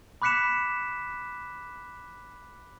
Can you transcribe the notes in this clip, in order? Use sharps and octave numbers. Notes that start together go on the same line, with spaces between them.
B5 D6 F#6 B6 C#7 E7